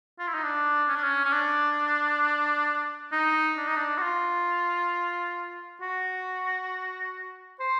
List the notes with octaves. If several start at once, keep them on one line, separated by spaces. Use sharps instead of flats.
F4
E4
D#4
D4
C#4
D4
C#4
C#4
D4
D#4
D4
D#4
D4
F#4
F4
F#4
C5